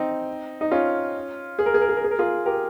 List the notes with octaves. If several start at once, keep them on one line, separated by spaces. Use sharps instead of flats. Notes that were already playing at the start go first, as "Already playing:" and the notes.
Already playing: C4 D#4
D#4
C#4 F4
G#4
A#4
G#4
A#4
G#4
A#4
G#4
A#4
F4 G#4
G4 A#4